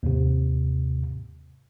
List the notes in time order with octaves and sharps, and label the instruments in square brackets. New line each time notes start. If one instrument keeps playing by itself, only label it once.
[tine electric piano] D#2 G#2 C3